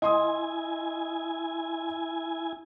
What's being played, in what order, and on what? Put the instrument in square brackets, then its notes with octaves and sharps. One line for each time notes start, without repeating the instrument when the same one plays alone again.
[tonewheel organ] E4 G#5 [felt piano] D#5 C6 D#6